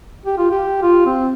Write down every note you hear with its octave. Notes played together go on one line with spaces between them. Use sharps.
G4
F4
G4
F4
C4